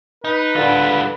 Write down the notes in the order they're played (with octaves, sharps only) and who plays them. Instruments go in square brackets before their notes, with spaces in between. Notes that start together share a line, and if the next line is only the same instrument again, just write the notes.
[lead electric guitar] D#4 [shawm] B4
[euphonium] D3 [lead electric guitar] G3 F4